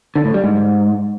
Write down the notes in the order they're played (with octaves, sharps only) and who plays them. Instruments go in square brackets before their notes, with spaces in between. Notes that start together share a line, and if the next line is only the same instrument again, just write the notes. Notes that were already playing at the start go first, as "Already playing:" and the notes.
[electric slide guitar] D3
A2
G3
G#2